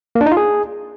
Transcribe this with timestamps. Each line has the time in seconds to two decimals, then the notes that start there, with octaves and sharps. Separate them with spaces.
0.15 A#3
0.21 D4
0.26 D#4
0.32 F4
0.37 G#4